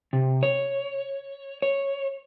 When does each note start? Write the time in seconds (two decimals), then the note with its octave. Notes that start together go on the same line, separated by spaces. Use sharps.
0.13 C3
0.43 C#5
1.62 C#5